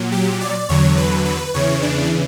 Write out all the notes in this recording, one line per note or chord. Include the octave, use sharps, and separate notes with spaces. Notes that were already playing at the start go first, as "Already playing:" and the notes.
Already playing: A#2 F#3
G4
D5
E2 D3 F#3 C#5
B4
B4
E2 C#3 E3 C#5
D4